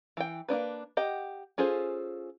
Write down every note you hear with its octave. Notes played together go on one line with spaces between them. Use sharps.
E3 G5
A#3 C4 D4 B4
G4 D#5 F#5
C#4 F4 G#4 A4 C5